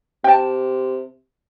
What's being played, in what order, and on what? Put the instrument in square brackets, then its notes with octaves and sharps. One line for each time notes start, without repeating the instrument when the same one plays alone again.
[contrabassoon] C3 [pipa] G5 A5